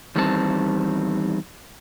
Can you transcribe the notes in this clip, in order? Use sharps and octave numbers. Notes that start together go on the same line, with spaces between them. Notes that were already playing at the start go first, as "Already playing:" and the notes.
E2 D#3 G3 C4 D#4 A5